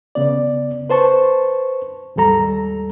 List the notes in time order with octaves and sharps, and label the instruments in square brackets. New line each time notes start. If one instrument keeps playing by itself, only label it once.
[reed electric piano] C#3 B3 D5
B4 C5 A5 C#6
D#2 G#2 G3 A4 A#5